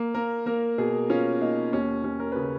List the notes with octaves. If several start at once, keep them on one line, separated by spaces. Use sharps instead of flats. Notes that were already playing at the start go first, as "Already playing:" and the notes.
Already playing: A#3
A#3 A#4
A#3 A#4
B2 G#4
C#4 F4
A#3 D#4
D#2 C#4
C#4
A#4
C#3 B4